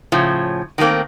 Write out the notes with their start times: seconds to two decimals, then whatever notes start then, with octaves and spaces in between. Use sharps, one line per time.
0.12 A2 C#3 F3
0.78 D#3 F#3 A3 A#3 C4